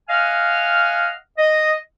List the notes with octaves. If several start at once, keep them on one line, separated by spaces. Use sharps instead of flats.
D#5 F5 F#5 G#5 F6
D#5